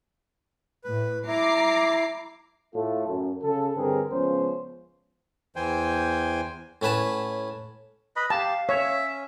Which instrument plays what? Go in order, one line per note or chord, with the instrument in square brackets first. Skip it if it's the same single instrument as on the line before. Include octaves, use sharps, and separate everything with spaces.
[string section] A2 [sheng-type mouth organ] B4
[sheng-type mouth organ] E4 [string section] A#5 D6 C7
[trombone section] A2 A3 F4 A4
F#2
C#3 A4
G2 D3 C4 G#4 A#4 B4
C#2 F3 B3 C#4 C5
[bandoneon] E2 E3 C5 G5 G#5
[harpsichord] A2 C#4 B4 A5
[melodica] B4 D#5 B5
[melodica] G4 [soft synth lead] F5 [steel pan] A5
[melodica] C#4 [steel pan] C#5 [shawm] E5